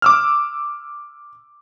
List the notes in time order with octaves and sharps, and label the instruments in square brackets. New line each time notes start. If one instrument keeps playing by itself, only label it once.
[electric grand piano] D6 E6 F6